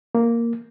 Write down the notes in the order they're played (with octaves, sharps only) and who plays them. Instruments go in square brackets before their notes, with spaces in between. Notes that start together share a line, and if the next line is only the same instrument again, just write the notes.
[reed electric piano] A#3